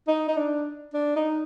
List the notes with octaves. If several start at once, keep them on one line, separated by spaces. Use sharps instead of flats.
D#4
D#4
D4
D4
D#4